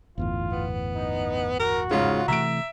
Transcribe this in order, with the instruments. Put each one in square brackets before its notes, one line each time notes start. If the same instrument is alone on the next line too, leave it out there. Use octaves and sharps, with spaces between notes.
[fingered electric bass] G1 E2 A2 [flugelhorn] F4
[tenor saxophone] B3
[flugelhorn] D#4
[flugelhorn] F#4 [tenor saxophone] A#4
[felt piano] G#2 C#3 [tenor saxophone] F4
[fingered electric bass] C3 E3 A3 [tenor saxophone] E5 [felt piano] A#5 D7